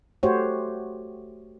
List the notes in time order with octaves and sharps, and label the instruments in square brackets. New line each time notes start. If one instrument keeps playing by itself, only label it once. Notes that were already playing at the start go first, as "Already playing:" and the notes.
[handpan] A3 F#4 G4 C5 C#5